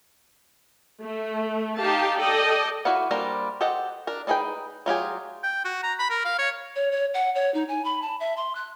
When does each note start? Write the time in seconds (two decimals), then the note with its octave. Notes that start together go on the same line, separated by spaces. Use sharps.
1.02 A3
1.79 D#4 G4 F5 A5
2.19 A4 D5 D#5 G5
2.85 E4 F#4 D5 F5 F#5
3.11 G3 A#3 D4 A#4 C5
3.61 G4 A4 C5 D#5 F#5
4.07 D4 A#4
4.27 D4 D#4 G#4 B4 G5
4.86 F#3 F4 G4 G#4
5.44 G5
5.65 F#4
5.83 A#5
5.99 B5
6.10 A#4
6.25 F5
6.39 C#5
6.76 C#5
6.92 C#5
7.14 F#5
7.35 C#5
7.54 D#4
7.68 G#5
7.85 B5
8.02 A5
8.20 E5
8.37 C6
8.55 F#6